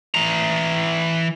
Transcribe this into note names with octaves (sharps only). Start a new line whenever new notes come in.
E3 A#5